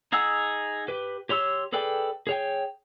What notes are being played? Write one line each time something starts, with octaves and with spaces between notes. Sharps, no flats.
D#4 G#4 F#5 E6
G4 B4
G4 C#5 C6 E6
G#4 A4 B4 D5 G5
G#4 C#5 G5